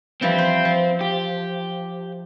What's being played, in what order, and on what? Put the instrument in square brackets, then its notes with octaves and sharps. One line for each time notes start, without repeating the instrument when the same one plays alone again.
[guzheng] E3 F3 G3 [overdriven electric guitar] C4
[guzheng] C5
F3
[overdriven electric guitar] G4